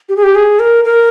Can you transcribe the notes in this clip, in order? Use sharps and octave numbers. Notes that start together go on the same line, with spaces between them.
G4
G#4
G4
G#4
A#4
A#4